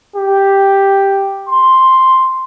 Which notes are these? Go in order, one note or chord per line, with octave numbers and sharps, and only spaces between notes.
G4
C6